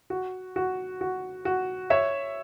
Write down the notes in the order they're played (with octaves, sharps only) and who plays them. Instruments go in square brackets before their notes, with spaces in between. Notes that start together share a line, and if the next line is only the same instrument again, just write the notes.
[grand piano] F#4
F#4
F#4
F#4
C#5 E5